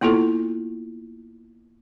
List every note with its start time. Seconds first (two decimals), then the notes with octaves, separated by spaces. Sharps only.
0.01 A#3 B3 E4 F4 A4